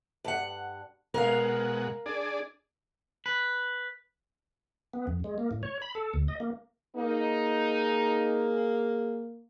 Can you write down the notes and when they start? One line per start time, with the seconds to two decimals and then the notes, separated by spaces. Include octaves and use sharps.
0.24 G2 F#5
1.14 B2 G#3 A#4 F5 F#5
2.06 D4 G#4 D5
3.26 B4
4.94 B3
5.07 F2
5.24 G#3
5.38 A#3
5.51 A2
5.63 C#5
5.82 B5
5.95 A4
6.14 D2
6.28 D#5
6.40 A#3
6.96 A#3 D#4 G#4